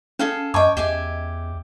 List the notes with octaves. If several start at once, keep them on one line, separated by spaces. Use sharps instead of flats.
C#4 G#4 A4 F5
F#2 C#5 D#5 G5 A5 D6
E2 G4 E5 G#5